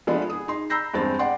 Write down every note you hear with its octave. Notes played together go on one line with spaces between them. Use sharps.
F3 G#3 A3 B3 D4
G#4 D#6
D#4 C6
A#5 B5 E6 G6 A#6 C7
E2 G2 G#3 C4 A6
D5 F#5 G5 C6